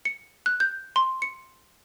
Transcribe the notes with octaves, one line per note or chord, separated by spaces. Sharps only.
C#7
F#6
G6
C6
C#7